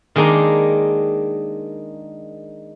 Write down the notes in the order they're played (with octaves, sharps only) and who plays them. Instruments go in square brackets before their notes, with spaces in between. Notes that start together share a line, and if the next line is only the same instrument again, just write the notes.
[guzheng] D#3 G#3 A#3 D4 D#4